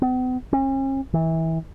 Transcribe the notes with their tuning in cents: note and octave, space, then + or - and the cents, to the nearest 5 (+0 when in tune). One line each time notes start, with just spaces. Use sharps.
B3 +45
C#4 -45
E3 -25